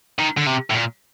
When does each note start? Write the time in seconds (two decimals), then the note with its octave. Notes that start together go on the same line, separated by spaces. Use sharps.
0.19 D#3
0.37 D3
0.47 C3
0.70 A2
0.74 A#2